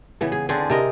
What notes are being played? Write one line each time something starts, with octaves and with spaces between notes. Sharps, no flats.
C#3 E3 B3
G#4
D3 C4 D4 G#4
C3 A#4 D#5